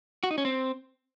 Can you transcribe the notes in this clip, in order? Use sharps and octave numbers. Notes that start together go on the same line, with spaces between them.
F#4
D#4
C#4
C4